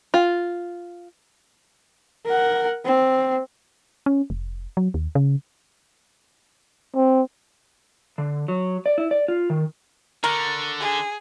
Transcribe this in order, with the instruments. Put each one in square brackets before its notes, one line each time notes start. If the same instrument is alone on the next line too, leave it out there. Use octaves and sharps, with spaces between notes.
[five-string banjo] F4
[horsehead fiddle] A#4 F#5
C4
[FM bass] C#4
F1
F#3
D#2
C#3
[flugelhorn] C4
[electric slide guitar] D3
F#3
D5
E4
D5
F4
D#3
[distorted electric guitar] D3 [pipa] A#4 [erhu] C#6
[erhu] G#4